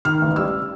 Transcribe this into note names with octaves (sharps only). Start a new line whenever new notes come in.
D#3 F6
A1
G3 E6